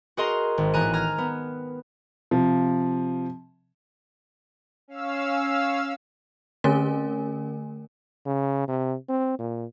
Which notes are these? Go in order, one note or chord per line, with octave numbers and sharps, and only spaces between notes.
F#4 G#4 A#4 D#5 A#5 C6
G#1
A1 B3 G#5 A#5 F#6 D#7
A#5 F6 G#6
B3
C3 F3
C#4 F5 E6
D3 A3 C#4 A#4 G#5
C#3
C3
C4
A#2